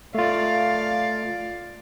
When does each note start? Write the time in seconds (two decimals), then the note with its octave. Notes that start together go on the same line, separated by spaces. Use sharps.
0.15 A3 F4 D5 F5